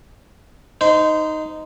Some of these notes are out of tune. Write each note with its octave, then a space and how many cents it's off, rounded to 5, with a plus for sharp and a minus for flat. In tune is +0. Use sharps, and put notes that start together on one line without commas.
D#4 +0 C5 -25